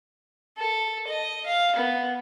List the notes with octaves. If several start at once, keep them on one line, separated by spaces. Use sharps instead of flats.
A4
D#5
F5
B3